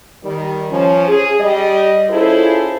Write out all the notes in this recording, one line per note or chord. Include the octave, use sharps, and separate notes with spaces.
D#3 G3
F3 C#4
G#4
G3 D#5
C#4 E4 F4 G#4 A4 C5